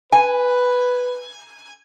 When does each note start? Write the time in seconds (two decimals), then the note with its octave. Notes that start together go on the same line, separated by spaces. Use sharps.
0.12 B4 G#5